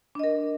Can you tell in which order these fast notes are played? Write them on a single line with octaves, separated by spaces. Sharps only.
D4 D#5 A#4